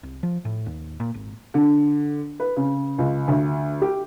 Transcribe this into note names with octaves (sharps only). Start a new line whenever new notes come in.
C2
F3
A2
D#2
A#2
G#1
D3
B4
C#3
C#2
D2
G4